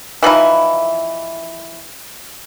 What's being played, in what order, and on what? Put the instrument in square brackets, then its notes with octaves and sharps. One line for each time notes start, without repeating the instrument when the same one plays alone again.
[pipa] E3 F3 D#4 E4